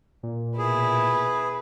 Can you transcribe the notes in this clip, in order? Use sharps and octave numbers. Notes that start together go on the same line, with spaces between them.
A#2
B2 E4 G#4 B4